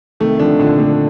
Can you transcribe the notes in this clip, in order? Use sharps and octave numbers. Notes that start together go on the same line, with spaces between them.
C3 D#3 A3
D3 F3 D4
A#2 D3
A3